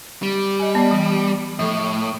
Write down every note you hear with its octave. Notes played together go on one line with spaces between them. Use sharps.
G3
D#5 G#5
B3 D5
E3
A2 F3 A4